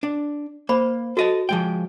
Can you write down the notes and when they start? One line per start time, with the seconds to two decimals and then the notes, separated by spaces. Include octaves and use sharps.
0.03 D4
0.69 A#3 C5 B5
1.17 F#4 A4 D#5 A5
1.49 F3 G#3 G5